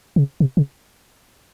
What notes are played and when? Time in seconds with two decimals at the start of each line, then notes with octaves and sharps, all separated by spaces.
0.16 C#3
0.40 C3
0.57 C#3